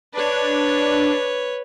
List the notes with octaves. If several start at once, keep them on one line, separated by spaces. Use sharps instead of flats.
D4 B4 C#5